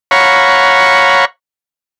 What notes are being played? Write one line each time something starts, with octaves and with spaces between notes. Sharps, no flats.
C#5 F5 F#5 A#5 B5 C#6